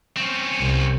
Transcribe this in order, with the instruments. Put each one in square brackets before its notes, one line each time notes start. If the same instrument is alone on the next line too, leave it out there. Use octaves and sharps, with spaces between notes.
[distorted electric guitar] C4 C#4
[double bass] C2